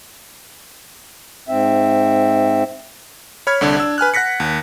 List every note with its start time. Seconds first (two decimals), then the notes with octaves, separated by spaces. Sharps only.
1.48 G#2 C4 E5
3.47 C#5 B5 F6 G#6
3.61 C2 D3 D4
3.77 D4 E6
3.98 B4 G#5 F6 F#6
4.14 F#5 F#6 A#6 B6 C#7
4.40 D#2